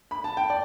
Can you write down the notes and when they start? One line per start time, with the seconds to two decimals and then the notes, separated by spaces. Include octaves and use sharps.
0.11 B5
0.24 A5
0.37 G5
0.50 D5